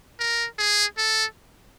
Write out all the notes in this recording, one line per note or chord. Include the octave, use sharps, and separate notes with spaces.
A#4
G#4
A4